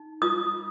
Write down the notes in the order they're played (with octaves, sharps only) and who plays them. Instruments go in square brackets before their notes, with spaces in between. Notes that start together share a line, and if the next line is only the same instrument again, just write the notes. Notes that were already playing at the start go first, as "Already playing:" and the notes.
Already playing: [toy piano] D#4
F4 D#6